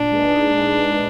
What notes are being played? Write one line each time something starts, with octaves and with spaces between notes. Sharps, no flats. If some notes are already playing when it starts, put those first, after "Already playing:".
Already playing: A#2 D4
G#3 D#4 G#4 B4
A#2
G#3 D#4 G#4 B4